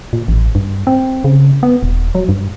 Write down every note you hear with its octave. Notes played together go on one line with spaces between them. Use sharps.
A#2
A1
G2
C4
C#3
B3
D#1
F#3
G2